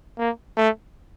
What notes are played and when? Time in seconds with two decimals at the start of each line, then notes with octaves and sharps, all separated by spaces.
0.18 A#3
0.57 A3